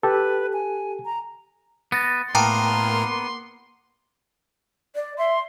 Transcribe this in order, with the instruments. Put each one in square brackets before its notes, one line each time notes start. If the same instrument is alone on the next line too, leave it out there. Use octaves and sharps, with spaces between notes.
[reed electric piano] G4 A4 [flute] B4
[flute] G#5
A#5
[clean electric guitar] B3 [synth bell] A6 A#6
[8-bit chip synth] A2 A#4 [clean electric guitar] A#3 B3 [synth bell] G5 A5 A#5 [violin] C6
[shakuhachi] D5
[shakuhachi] E5 [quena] C6